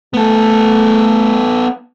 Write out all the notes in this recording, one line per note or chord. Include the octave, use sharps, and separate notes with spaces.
A3 B3 A4